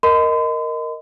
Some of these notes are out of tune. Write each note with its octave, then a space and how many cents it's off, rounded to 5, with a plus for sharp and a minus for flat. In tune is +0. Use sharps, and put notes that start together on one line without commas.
A#4 +0 D#5 +0 C6 -45